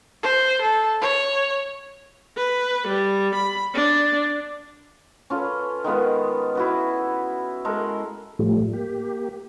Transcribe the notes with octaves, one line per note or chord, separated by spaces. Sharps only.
C5
A4
C#5
B4
G3
B5
D4
C#4 F4 A4 B4
D#3 G#3 B3 F4
E4 F#4 B4
G#3 A4 A#4
A2 F3 G3 A3
A#3 G4